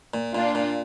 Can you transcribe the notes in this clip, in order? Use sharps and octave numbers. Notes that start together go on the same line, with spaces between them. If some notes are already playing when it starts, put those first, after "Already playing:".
A#2
A#2 D4 F4
A#2